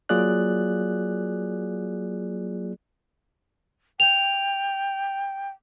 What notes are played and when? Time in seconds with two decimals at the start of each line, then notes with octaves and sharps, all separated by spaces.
0.09 F#3 A#3 F4 G#4 D5 F#6
4.00 G5 F7